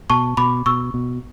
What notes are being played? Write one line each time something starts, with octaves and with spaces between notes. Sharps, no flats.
B2 A5 C#6
B2 B5 D6
B2 C#6 E6
B2